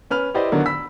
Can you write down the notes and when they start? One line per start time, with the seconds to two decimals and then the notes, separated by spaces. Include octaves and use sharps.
0.11 C#4 B4 F6 F7
0.34 E4 G4 B4 C5 D5 D#5
0.52 D3 D#3 F#3 B3 D4
0.66 B5 E6 B6